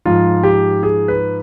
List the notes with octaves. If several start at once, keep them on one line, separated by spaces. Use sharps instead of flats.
G#2 F3 F4
G4
G#4
B4